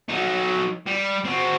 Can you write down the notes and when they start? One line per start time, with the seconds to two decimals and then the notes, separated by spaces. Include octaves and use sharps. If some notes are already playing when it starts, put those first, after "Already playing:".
0.09 F#3 D#4
0.86 G3
1.24 C4 F#4